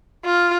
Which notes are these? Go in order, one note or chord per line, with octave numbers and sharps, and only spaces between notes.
F4